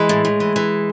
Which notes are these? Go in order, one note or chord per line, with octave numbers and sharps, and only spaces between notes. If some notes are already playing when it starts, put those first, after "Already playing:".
Already playing: E3 G#3
A2
A2
E3
E3